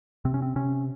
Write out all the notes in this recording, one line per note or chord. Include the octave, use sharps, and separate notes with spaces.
C3 C4
C#4
C4
C3 C#4